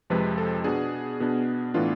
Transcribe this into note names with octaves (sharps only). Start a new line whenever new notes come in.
F2 C3 F3 G#3 C4 B4
A4
B2 B3 D4 G#4
B2 B3 D4
A2 E3 B3 D4 F4